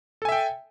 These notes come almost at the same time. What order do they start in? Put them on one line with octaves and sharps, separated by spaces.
A4 G#5 E5 G5